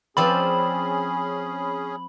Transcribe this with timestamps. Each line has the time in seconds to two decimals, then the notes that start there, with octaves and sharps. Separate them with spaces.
0.17 F3 C4 C#4 G#4 D5 B5